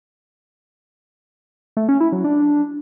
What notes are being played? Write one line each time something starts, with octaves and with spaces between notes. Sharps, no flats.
A3
C#4
E4
F#3
D4